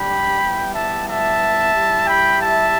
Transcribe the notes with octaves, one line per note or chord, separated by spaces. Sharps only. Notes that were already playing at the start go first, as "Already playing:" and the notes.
Already playing: G3 D4 G4 G5 B5
G3 B3 E4 G4
E5 A5
E5 A5
G3 E4 G4
G5 B5
E5 A5